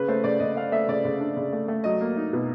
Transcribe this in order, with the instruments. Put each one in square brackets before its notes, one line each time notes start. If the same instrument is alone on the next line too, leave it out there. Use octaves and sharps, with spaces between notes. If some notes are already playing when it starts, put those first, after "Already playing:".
Already playing: [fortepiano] C#3 B4
A3 C5
C#3 D5
C#3 D#5
A3 F5
A3 E5
C#3 D5
C#3
D4
C#3
A3
A3
F#3 D#5
A#3
D#4
B2